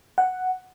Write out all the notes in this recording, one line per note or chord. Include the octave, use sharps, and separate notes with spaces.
F#5